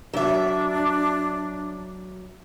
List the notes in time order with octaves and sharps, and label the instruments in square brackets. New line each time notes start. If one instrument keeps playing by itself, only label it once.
[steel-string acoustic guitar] F#3 E5 [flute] D4